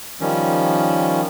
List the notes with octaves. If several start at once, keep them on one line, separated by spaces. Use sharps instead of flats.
D#3 F3 G3 C#4